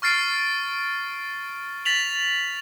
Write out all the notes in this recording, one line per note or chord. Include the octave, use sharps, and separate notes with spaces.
C#6 F6 A6 C7 D7
A6 B6 F7 F#7